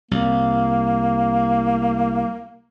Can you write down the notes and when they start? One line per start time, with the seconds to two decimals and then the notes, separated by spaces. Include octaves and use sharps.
0.11 C2 A#3